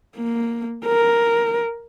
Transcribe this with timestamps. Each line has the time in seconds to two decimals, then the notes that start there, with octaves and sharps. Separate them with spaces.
0.17 A#3
0.85 A#4